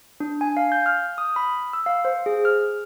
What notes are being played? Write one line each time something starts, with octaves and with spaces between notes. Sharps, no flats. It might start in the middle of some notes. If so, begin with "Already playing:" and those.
D4
G#5
F5
G6
F6
D#6
B5
E6
F5
C5
G#4
F6